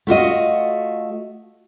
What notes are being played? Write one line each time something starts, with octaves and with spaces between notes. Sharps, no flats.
A3 F4 F#4 D#5